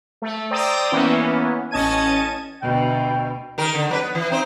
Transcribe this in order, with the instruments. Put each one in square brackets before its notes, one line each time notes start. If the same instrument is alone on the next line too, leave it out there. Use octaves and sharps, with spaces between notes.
[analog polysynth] A3
C5 D5 G5 A#5 D#6 E6
E3 A#3 B3 C#4 E4
A1 C#4 D#5 A5 G#6 D#7
[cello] D2 B2 [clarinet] G5
[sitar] D#3 A#4
D3
F#3 A#4 B4
B3
E3
C4 D#4 C5